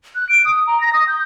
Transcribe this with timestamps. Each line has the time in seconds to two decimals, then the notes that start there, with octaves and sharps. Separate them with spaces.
0.15 F#6
0.29 D7
0.45 D#6
0.67 A#5
0.81 A#6
0.93 D#6
1.08 G6